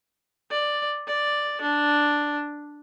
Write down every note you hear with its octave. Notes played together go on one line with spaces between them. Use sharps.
D5
D5
D4